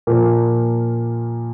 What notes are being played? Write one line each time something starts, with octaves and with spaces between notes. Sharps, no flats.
A#2 F3 A#3